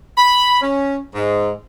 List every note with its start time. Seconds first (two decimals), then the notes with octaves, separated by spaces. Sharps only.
0.18 B5
0.62 C#4
1.15 G#2